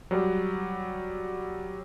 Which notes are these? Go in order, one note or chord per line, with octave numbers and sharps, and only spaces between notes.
F#3 G3